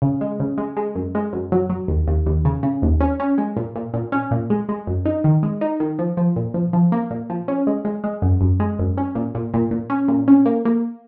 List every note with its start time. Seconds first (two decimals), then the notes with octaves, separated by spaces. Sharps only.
0.02 C#3
0.21 G#3
0.40 C#3
0.58 G#3
0.77 G#3
0.95 F#2
1.15 G#3
1.33 F#2
1.52 F#3
1.70 F#3
1.88 D#2
2.08 D#2
2.26 D#2
2.45 C#3
2.63 C#3
2.82 D#2
3.00 C#4
3.20 C#4
3.38 G#3
3.57 A#2
3.76 A#2
3.94 A#2
4.12 C#4
4.31 A#2
4.50 G#3
4.69 G#3
4.87 F#2
5.05 D#4
5.24 D#3
5.43 G#3
5.61 D#4
5.80 D#3
5.99 F3
6.17 F3
6.36 A#2
6.54 F3
6.73 F3
6.92 A#3
7.11 A#2
7.30 F3
7.48 C#4
7.67 G#3
7.85 G#3
8.04 G#3
8.22 F#2
8.41 F#2
8.60 G#3
8.79 F#2
8.97 C#4
9.15 A#2
9.35 A#2
9.54 A#2
9.71 A#2
9.90 C#4
10.08 A#2
10.28 C#4
10.46 A#3
10.65 A#3